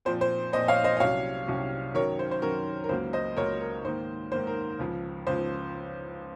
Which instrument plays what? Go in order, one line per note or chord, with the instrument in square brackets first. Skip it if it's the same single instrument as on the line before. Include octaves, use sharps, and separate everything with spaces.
[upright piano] A#2 F3 C4 C5
C5
A#2 F3 C4 C5 D#5
C#5 F5
C5 D#5
D#5
C2 C3 F#3 C#4 C#5 F5
C2 C3 F#3 C#4
F#2 D#3 F#3 C#4 A#4 C#5
C5
C5
F#2 D#3 F#3 C#4 A#4
A#4
C#2 C#3 F#3 A#3 C5
C5 D#5
C#2 C#3 F#3 A#3 A#4 C#5
A#4
G#2 D#3 A#3 C5
G#2 D#3 A#3 C5
A#4
C#2 C#3 F3
C#2 C#3 F3 C5